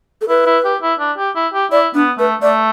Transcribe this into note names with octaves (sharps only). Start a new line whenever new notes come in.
A4
E4 B4
E4
G4
E4
D4
G4
E4
G4
E4 D5
B3 D4
A3 B4
A3 D5